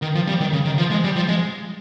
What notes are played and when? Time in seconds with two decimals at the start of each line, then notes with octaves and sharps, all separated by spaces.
0.02 D#3
0.15 F3
0.28 G3
0.40 D#3
0.53 C#3
0.65 D#3
0.78 F3
0.91 G#3
1.04 G3
1.16 F3
1.28 G#3